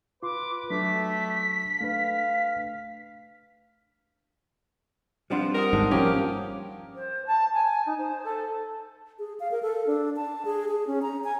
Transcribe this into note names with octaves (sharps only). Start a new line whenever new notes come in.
F4 B4 C6 D6
F#3 A3 D4 B6
A3 D4 B4 F5
F3 G3 C4 D4 F#5 C6
G4 A#4 F#5 D#6
G#1 G#2 A5
F3 A#3 C#4 G4
C5
A5
G#5
D#4
C5
A4
G#4
F5
A#4
A4
D4
A5
G#4
G#4
C#4
A#5
G#5